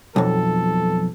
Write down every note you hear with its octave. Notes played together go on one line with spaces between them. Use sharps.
B1 F2 A4